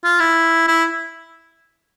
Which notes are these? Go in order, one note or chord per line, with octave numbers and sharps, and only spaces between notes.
F4
E4
E4